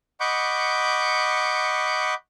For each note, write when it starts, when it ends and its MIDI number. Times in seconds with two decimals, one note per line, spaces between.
0.20 2.14 75
0.20 2.14 78
0.20 2.14 83
0.20 2.14 85
0.20 2.14 86
0.20 2.14 91